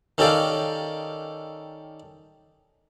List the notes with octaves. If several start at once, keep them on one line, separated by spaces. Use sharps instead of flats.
D#3 C#4 G4 A4 D5 F5